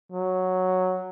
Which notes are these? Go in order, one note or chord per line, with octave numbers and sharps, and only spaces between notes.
F#3